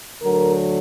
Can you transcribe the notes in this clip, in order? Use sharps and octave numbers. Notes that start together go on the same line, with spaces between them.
D2 D3 F#3 A#4